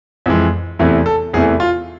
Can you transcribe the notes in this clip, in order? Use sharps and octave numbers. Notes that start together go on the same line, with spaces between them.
F2 E3 G#3
E2 C3 E3 A3
A4
E2 C3 E3 A3 G#4
F4